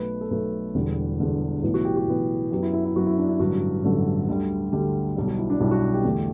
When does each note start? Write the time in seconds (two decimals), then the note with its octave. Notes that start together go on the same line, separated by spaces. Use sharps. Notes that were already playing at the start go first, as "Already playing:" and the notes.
Already playing: B1 B2 A3 B4
0.21 A4
0.31 B1 B2 A3 B4
0.74 E1 E2 D3 G3
1.19 E1 E2 D3 G3
1.63 B1 A2 E3 B3
1.74 F#4
1.85 G4
1.96 F#4
2.07 B1 A2 E3 B3
2.51 F#2 F#3 B3 G4
2.62 E4
2.73 E4
2.85 E4
2.96 F#2 F#3 B3 F#4
3.07 E4
3.18 D4
3.29 E4
3.39 A1 G2 D3 F#3 F#4
3.83 A1 G2 D3 F#3 A4
4.28 D2 D3 G3
4.72 D2 D3 G3 G4
5.16 B1 B2 G3 G4
5.27 F#4
5.39 E4
5.50 D4
5.61 B1 B2 G3 E4
5.71 F#4
5.94 G4
6.04 E2 D3 A3